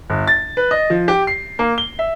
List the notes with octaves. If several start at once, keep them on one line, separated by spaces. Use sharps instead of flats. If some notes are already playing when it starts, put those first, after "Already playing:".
G1
A6
B4
D#5
F3
G4
C7
A#3
G7
E5